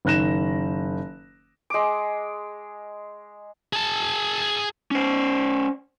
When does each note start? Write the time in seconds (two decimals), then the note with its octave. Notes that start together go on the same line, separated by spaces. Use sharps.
0.05 F#1 D#3 F#6 A#6 E7
1.70 G#3 D6
3.73 G#4 A5
4.91 C#4 C5